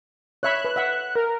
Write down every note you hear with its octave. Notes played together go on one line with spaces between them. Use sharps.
C#5 E5 B5 F#6
B4
E5 F#5
A#4